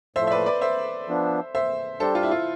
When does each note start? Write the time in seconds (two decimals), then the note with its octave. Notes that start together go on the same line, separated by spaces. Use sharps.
0.16 A2 F3 A3 C5 E5
0.27 E5
0.31 B4 D5
0.46 B4 D5
0.61 C5 E5
1.08 F3 B3 D4
1.55 C5 E5
2.00 G3 D4 G4 A4 C5
2.15 F4 A4
2.23 E4
2.31 F4